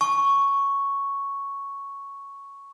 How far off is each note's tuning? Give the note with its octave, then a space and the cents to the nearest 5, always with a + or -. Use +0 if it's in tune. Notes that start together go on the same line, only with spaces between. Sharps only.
A5 -35 C#6 +0